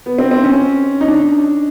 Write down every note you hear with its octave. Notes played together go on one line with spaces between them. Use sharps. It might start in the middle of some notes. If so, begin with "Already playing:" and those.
B3
C4
C4
C#4
D#4
D4